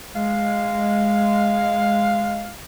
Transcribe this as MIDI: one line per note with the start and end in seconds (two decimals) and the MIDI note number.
0.16 2.51 56
0.16 2.53 77